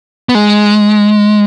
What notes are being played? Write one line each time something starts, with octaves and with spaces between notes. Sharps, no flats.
B3
G#3